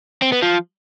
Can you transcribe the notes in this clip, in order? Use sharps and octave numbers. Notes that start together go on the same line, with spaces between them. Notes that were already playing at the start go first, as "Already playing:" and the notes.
C4
B3
F3